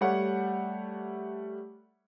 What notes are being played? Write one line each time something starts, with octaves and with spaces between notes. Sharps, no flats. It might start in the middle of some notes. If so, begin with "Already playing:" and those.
G3 A3 C#5 F#5